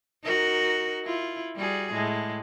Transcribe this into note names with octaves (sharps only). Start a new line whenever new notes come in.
D#4 F#4 A#4
E4 F4
G3 F#4 G#4
A2 G#3